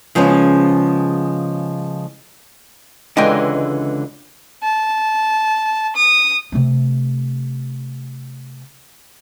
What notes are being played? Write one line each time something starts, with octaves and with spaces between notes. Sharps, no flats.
C#3 F3 G#3 B3 C#4
C#2 D3 E3 G#3 D#5 G5
A5
D#6
C3 A3